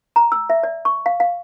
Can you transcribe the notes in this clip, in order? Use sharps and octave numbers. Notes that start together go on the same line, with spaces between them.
A#5
E6
E5
D5
C#6
F5
F5